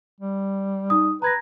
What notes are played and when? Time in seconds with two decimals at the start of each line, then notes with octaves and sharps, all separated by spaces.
0.21 G3
0.90 D#4 D#6
1.22 B4 A#5 G#6 A#6